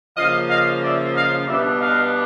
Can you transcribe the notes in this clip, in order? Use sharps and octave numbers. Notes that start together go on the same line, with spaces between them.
C#3 F3 A#3 D#5 F5
D#5 F5
D5 E5
D#5 F5
B2 G3 B3 D4 D5 E5
D#5 F5